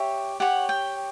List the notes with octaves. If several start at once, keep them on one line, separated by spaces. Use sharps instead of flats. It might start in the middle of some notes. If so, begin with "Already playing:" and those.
Already playing: G4 C#5 E5
G4 C#5 F#5
G5